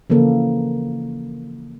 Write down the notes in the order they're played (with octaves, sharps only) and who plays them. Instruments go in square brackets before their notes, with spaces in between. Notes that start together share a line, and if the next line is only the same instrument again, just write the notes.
[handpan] C#3 E3 F3 A#3 A4